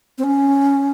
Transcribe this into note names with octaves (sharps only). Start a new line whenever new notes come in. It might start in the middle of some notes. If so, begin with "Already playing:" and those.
C4
C#4